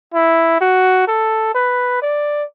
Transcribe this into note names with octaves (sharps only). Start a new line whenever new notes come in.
E4
F#4
A4
B4
D5